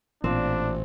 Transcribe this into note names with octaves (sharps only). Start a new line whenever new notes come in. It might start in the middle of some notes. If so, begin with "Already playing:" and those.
A1 A#2 C4 D4